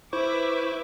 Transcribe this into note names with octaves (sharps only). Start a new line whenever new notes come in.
E4 B4 C5 E5 C#6 D6